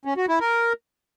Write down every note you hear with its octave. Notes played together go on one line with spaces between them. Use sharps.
C#4
F#4
E4
A#4